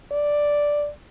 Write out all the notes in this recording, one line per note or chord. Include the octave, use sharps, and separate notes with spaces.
D5